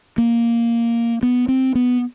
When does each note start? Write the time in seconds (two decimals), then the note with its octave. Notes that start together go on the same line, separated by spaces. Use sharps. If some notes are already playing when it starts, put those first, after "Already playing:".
0.18 A#3
1.23 B3
1.48 C4
1.75 B3